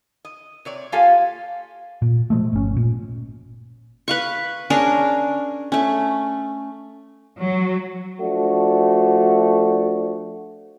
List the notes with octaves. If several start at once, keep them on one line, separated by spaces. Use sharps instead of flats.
D#5
C3 C#5 D5
A#3 F4 G4 A4 F5 G#5
A#2
B2 F3 G#3 A3
G1 C#4
A#2
B4 F5 C#6
C#4 D4 G#4 A#4
A3 C#4
F#3
F3 A3 D4 F#4